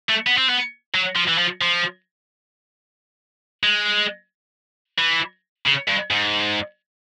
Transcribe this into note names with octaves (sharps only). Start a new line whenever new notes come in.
A3
B3
C4
B3
F#3
F3
E3
F3
F3
G#3
E3
C#3
G2
G#2